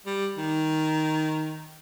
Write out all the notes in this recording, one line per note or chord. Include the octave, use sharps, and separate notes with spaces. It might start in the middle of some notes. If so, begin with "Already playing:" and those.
G3
D#3